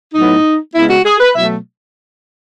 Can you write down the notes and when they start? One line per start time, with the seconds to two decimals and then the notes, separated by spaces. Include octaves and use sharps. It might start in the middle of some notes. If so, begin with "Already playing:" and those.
0.14 A2 F#3 B3 D#4
0.75 C#3 G#3 B3 E4
0.90 F#4
1.05 G#4
1.20 B4
1.35 B2 F#3 A3 E5